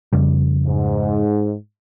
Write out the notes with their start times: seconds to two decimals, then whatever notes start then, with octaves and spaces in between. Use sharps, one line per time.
0.13 F2 C#3 G3
0.66 G#2